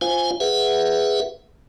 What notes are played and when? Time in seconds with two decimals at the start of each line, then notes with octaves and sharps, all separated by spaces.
0.01 F4 C5 F5 G#5
0.40 G#4 B4 E5 F#5